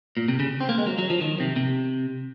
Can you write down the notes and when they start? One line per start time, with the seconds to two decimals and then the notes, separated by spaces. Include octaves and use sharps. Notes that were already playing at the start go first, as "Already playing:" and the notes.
0.17 A#2
0.28 C3
0.40 C#3
0.61 C4
0.69 A#3
0.78 G#3
0.87 F#3
0.98 F#3
1.10 F3
1.21 D#3
1.40 C3
1.56 C3